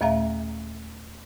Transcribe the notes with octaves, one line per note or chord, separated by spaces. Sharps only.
D#2 A#2 A3 E5 F5 A#5